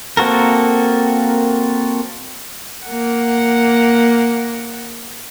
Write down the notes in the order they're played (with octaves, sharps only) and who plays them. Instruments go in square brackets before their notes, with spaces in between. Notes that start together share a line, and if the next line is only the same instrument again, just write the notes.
[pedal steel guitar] A#3 C4 F#4 A4 A#4
[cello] A#3 F#5